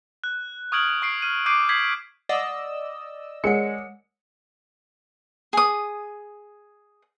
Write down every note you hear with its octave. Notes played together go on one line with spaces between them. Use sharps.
F#6
C#6 D#6 F6 G#6 D7 F#7
C#6 C7 D7
F6 D#7
D6 G6 C7 D7 D#7
G6 G#6 B6 C7 F#7
D5 D#5 F#5 D#6 E6
G#3 A#4 C#5 F#5 C#7
G#4 D#6